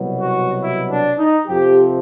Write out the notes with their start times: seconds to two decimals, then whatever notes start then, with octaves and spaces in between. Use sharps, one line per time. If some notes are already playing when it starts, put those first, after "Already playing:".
Already playing: C2 B2 F#3
0.20 F#4
0.62 E4
0.90 D4
1.19 D#4
1.47 F2 C3 F3 G4